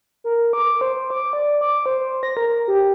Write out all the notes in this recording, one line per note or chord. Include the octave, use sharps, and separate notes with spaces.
A#4
D6
C5
D6
D5
D6
C5
A#6
A#4
G4